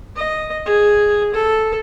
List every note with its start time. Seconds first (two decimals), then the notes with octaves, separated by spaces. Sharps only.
0.16 D#5
0.66 G#4
1.34 A4